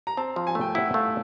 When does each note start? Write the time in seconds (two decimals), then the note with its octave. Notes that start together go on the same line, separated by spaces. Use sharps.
0.07 A#5
0.17 C4 A5
0.36 F3
0.47 G#5
0.55 A3
0.61 G5
0.75 E4 F#5
0.94 A3 F5